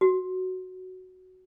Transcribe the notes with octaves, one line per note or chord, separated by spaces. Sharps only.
F#4